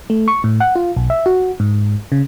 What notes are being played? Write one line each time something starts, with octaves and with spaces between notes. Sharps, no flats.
A3
C#6
A2
F#5
F4
B1
E5
F#4
G#2
C#3